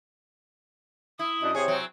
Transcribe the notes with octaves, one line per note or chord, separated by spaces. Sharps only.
E4 D#6
F#2 D4 D#5
C3 G#4 C#5
F#3 C4